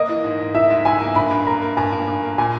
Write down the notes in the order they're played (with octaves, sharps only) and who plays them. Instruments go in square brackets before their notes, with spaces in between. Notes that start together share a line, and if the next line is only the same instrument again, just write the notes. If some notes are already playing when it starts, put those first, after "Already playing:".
Already playing: [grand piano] A#3 [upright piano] D#5
[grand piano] E3
G#2
G#2
[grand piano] E3 [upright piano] E5
[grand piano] G#2
[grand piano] G#2 [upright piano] G#5
[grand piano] A#3
[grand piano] G2 [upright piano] B5
[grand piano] G2
[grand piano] A#3 [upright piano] A#5
[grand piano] A#3
[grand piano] G2 [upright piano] G#5
[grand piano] G2
G2
A#3
[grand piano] A#2 [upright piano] G#5